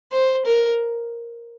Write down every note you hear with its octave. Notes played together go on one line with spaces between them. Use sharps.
C5
A#4